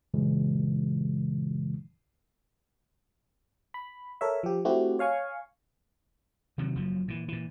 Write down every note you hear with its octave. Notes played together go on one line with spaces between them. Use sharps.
F#2 A#2 C#3 E3 G#3
B5
A4 A#4 C#5 E5
F3 G4
A3 C4 E4 F#4 G4
C#5 F5 G#5 C#6
C3 D#3 F#3
F#1 F#2 C#3 F3
A#2 E3
A#2 E3